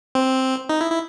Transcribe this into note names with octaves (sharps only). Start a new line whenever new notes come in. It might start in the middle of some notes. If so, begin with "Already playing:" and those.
C4
D#4
E4
E4